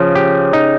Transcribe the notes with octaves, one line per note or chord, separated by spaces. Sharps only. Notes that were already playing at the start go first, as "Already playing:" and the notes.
Already playing: C#3 F3
G4
D#4